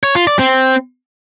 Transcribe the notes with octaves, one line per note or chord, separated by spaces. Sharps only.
C#5
F4
D5
C4